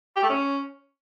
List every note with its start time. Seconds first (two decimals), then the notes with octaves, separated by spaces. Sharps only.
0.16 G4
0.23 A3
0.30 C#4